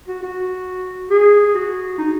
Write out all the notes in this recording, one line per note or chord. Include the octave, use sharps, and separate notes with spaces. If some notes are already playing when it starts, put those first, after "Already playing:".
F#4
F#4
G#4
F#4
D#4